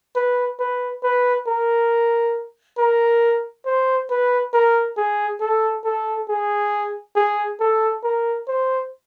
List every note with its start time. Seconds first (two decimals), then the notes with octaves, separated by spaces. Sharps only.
0.16 B4
0.60 B4
1.03 B4
1.47 A#4
2.78 A#4
3.66 C5
4.10 B4
4.54 A#4
4.97 G#4
5.41 A4
5.85 A4
6.29 G#4
7.16 G#4
7.60 A4
8.04 A#4
8.48 C5